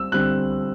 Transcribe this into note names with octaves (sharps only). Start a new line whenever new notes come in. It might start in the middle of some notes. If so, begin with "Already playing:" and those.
Already playing: G3 C4 E6
D3 G3 C4 F#6